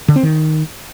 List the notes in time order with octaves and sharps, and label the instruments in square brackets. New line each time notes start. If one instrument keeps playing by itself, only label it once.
[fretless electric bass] D3
C4
D#3